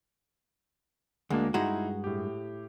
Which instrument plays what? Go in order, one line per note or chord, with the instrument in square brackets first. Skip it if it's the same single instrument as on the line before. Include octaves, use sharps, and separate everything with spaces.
[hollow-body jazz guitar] D2 [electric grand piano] G#3 A#3 D4
[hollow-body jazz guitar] G2 G#3 F#4 [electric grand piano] D#4 E4 A#5
[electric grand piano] A2 G4